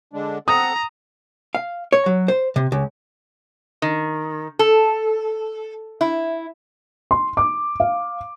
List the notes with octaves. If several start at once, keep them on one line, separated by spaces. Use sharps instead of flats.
D3 G#3 D4
C4 A4 F#5 A#5 D#6
F5
C#5
F#3
C5
C3
C#2
D#3
A4
E4
C6
D6
F5